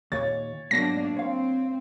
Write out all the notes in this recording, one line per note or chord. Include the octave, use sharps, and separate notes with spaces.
D#2 A#2 C#5 A6
G#2 B2 F#3 A#3 D4 A#6
C4 C#5 F5